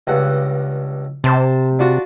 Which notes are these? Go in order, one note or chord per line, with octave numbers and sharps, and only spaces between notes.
C#2 G2 F#5
C3 C5 A5
D4 F4 F#4